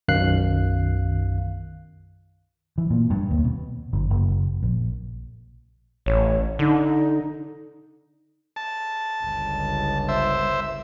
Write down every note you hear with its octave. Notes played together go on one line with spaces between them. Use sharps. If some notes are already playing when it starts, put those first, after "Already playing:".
B1 F#2 D#3 F5 F#6 C7
E3
A#2
G2
D#2
B2
G1
F#1
A#1
A1 C#5
D3 D#4
A5
G1 C#2
C5 E5